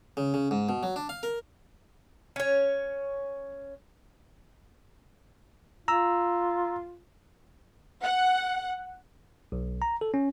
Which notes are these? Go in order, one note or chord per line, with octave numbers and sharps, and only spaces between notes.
C#3
C#3
G#2
B2
F#3
D4
F5
A#4
C#4 C#5
F4 A#5 E6
F#5
B1
A#5
A4
C#4